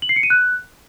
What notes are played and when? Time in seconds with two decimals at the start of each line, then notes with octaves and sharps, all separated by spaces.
0.02 F#7
0.09 C7
0.16 C#7
0.23 D#7
0.30 F#6